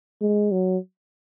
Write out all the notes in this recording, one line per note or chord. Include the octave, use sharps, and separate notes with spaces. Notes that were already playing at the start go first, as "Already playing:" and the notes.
G#3
F#3